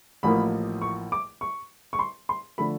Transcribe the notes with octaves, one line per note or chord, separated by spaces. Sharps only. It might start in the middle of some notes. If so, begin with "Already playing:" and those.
A1 A2 F3 A#3 B5
C#6
D6
C#6
C#6
C6
C6
D3 F3 A3 B5